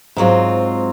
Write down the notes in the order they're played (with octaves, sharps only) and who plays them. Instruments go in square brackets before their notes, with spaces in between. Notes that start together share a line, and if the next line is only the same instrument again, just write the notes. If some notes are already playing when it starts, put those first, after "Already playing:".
[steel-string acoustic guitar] G#2 F#3 C4 F4